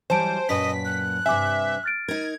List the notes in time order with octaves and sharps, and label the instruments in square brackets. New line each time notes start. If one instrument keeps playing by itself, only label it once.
[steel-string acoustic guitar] E3 F#3 G3 [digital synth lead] C5 [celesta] G#5 A5 D7
[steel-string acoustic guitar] F#2 A#2 B4 [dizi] D#5 [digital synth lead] B6
[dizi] F#6
[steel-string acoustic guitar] G2 C3 [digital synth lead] E5 [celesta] G#5 D6
[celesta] F6 A6 D7
[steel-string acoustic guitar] D#4 A#4 [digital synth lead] G#6